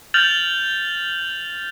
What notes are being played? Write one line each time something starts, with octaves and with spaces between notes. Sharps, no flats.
F6 G6 A6 F7 F#7